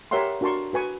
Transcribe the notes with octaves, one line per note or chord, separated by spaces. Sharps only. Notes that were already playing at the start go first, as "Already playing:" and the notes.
G4 A#4 C#5 E5 F#5 C6
D4 F#4 A#4 A5 C6 C#6
F#4 B4 G#5 C#6